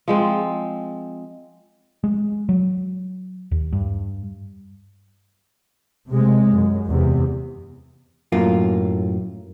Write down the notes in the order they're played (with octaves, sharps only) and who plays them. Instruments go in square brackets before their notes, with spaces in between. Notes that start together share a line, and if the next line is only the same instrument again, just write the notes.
[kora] F3 G#3 C4
[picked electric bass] G#3
F#3
D#2
G2
[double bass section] C3 G#3
F#2
E2 C3
[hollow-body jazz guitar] F#2 A2 A#3 F4